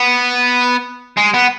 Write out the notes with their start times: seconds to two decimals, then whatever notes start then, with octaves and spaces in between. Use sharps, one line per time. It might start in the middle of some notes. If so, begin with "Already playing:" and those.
Already playing: B3
1.17 G#3
1.34 B3